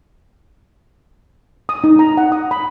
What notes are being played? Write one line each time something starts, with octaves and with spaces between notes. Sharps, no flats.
D#6
D#4
A#5
F#5
D#6
B5